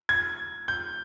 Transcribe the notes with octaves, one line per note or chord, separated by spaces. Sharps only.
G#6
G6